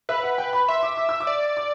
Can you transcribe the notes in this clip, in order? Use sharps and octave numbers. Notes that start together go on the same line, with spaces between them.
B4 E5
F#5
G5
B5
E5 C6
D6
D6
E6
D6
D5
D6